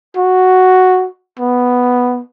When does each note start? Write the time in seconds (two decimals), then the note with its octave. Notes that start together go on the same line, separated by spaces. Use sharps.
0.17 F#4
1.39 B3